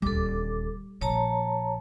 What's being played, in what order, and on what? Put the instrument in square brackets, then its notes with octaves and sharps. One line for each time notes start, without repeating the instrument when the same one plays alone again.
[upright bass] D#1 D2 [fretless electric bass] G3 [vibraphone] A4 D6
[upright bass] A#1 [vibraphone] C#5 A5 A#5